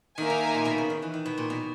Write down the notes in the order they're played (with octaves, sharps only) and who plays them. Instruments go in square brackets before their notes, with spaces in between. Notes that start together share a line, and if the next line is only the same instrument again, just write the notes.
[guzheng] D#3 [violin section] A#3 D#4 A#4 E5 G#5
[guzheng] D#3
A#2
B2
C#3
D#3
E3
D#3
B2
A#2
B2